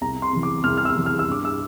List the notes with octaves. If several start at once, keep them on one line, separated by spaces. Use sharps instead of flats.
C2 A#5
C6
C3 E3
D6
C2 F6
F6
E6
C3 E3
F6
E6
G2 D6
E6